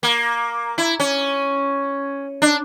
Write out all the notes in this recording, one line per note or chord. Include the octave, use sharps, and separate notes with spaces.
A#3
E4
C#4
D4